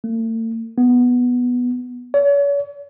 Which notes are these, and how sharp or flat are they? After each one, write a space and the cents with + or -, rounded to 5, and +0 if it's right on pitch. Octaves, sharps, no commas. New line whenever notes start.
A3 +45
B3 -5
C#5 +40